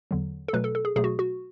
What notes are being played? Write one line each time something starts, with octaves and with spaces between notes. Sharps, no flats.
E2 D3 F#3
A4
B2 F#3 A3 B4
A4
A4
G#4
B2 F#3 A3 G#4
F#4
F#4